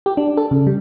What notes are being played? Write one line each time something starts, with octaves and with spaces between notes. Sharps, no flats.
G4
D4
A4
C#3
G3